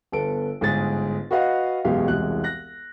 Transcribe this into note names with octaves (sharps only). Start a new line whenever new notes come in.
G1 B3 A4 D7
G1 G#2 G#4 A6
F#4 B4 D#5 F5 F#5
E1 F#2 B2 G#3 G4 F5
E1 C2 G#3 F#6
F#6 A#6